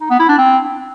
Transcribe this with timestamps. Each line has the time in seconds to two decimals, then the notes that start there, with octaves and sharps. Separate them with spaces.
0.01 D#4
0.10 B3
0.19 E4
0.29 D4
0.38 C4